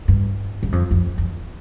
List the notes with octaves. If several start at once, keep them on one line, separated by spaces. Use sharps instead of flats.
G2
G2
F2
F2
F2